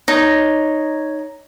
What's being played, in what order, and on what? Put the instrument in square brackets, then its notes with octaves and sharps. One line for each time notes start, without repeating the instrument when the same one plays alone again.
[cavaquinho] D#4 [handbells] C#5